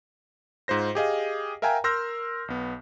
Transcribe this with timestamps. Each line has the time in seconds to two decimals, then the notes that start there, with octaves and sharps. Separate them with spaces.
0.68 G#2 F4 C5 A#6
0.95 G4 G#4 D#5 F5
1.62 A#4 E5 F5 G5 G#5 A#5
1.84 A#4 C6 E6 F6 G6 A#6
2.48 B1 B3